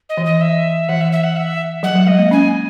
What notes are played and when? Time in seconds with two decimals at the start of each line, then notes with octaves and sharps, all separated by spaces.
0.09 D#5
0.17 E3
0.25 D#5
0.41 E5
0.89 E3 F#5
1.01 E5
1.12 E5
1.23 F#5
1.36 E5
1.83 F#3 F#5
1.95 F#3
2.07 G#3 D#5
2.19 A#3
2.31 C#4 G#5